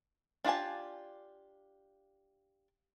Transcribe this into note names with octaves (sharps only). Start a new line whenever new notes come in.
D4 F4 G4 G#5 A5